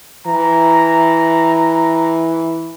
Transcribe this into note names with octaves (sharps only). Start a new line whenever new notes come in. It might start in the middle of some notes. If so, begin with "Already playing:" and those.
E3 A#5